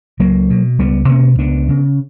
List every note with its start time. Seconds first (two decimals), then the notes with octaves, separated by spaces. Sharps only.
0.19 C#2 F#3 A#3
0.50 B2
0.79 C#2 G3 B3
1.08 B2 A#3 C#4
1.39 C#2 B3 D4
1.69 C#3